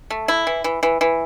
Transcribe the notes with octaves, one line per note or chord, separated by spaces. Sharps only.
A3
E4
E3
E3
E3
E3